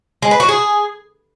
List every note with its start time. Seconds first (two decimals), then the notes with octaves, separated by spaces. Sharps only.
0.22 G#3
0.31 B4
0.40 F#4
0.49 G#4